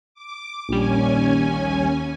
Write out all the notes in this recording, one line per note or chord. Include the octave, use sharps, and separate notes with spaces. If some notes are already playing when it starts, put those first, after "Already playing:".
D6
A#1 D#2 G3 C#4 G#5